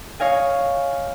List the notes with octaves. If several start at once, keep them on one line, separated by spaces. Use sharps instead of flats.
C#5 D#5 F5 G#5